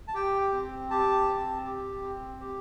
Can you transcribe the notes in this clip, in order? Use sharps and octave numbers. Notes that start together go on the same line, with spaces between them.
A5
G4 G5
C4
G4 A5
C4
G4
C4
G4